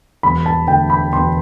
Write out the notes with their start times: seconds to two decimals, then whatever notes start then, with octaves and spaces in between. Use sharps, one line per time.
0.23 E1 B5
0.46 A5
0.68 D2 G5
0.90 B5
1.13 E1 C6